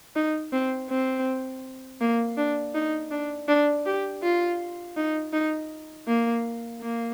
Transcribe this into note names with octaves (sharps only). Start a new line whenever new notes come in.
D#4
C4
C4
A#3
D4
D#4
D4
D4
G4
F4
D#4
D#4
A#3
A#3